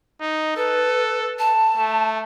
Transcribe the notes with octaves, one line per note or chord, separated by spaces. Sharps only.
D#4
A4 B4
A5
A3